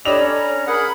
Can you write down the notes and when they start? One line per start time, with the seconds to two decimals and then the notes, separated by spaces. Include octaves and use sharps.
0.05 D4 G4 A4 C#5 D#5 B5 E6 F7
0.20 C#4 A#5
0.67 G#4 A#4 F#5 B5 F#6